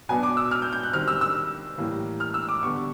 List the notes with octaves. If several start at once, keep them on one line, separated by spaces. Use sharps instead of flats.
B2 F#3 B3 D4 G#5
D6
E6
F6
G6
G6
F#6
D#3 G3 C4 F6
E6
E6
A2 E3 G3 A#3
F6
E6
D6
D3 G3 B3 C#6